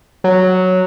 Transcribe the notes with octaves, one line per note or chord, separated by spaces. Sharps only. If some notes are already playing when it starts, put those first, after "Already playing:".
F#3